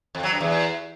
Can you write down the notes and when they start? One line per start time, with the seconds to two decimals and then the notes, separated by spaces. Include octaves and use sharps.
0.15 F2
0.23 F#3
0.32 G2
0.41 E2